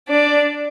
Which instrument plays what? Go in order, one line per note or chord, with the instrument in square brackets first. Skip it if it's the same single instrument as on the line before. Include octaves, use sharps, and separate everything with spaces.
[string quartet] D4 D5